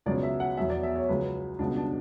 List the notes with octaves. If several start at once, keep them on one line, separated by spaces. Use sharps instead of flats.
C#2 B2 F#3 D5
E5
F#5
E2 B2 F#3 E5
D5
E5
C#5
C#2 C#3 F#3 B4
C#2 B2 G3 D4
D4